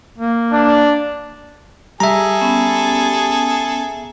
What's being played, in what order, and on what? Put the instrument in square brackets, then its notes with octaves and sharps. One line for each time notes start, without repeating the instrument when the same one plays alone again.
[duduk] A#3
[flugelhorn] D4
[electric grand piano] G3 [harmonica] G#4 A4 [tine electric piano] E5 A#5
[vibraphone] B3 C#4